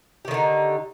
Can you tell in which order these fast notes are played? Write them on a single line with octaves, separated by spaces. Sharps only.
G4 D#3 D3 D#4